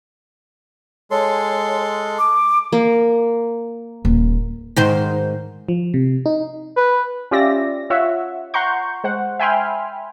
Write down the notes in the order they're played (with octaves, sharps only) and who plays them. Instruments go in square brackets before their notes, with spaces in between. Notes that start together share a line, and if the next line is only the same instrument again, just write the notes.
[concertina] G#3 A4 C6 [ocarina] C#5
[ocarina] D6
[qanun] A#3
[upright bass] D#1
[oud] G#2 D#3 C5
[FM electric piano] F3
C3
D#4
[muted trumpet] B4
[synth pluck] C#4 F4 G4 D5 E5 A#6
F4 C#5 E5 F#5
F#5 A#5 C6 C#6 G6
G#3 C5 F#5
E5 G5 G#5 B5 C6 F6